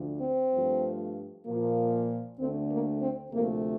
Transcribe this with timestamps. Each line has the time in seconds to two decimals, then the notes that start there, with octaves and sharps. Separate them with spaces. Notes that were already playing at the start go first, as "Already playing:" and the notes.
Already playing: D2 D3 F3
0.20 C4
0.52 G2 F3 A3
1.45 A#2 F3 A#3
2.38 D2 D3 A3 C4
2.70 A#3
3.00 C4
3.31 D2 C3 F3 A3 A#3